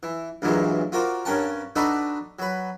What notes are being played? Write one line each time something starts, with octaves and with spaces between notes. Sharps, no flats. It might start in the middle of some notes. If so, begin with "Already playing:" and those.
E3
D2 G2 A#2 E3 F#3 G#3
F4 F#4 A#4 C5 D5
G2 C#4 A#4 F#5 G5 A5
D4 D#4 F#4 A4 B4 D5
F#3 B4